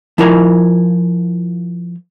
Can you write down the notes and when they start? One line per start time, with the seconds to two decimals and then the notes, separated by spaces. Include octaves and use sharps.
0.18 F3 E4 F4 A#4 G#5